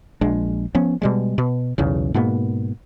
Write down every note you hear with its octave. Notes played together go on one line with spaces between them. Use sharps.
A#1 G#3 D4
F3 B3 C#4
B2 G3 G#3
B2
B1 E2 C#3
G#2 B2 A#3 B3